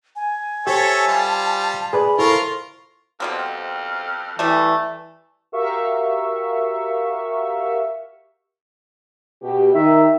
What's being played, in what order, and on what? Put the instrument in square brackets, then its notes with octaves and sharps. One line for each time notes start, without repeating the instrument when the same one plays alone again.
[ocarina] G#5
[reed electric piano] G4 C5 [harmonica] A4 C#5 E5 [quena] A5
[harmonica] G3 F4
[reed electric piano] G#4 B4 D5 [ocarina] B5
[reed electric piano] E4 A4 C5 [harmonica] F4 A#4 C6 [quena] C#6
[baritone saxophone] F2 [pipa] B2 G3 C4
[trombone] E3 [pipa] G3 A3
[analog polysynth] F#4 G4 A#4 E5 F5 C#6
[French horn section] B2 G4
[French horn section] D#3 [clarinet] E5